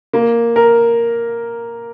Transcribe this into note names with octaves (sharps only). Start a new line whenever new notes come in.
A#3
A#4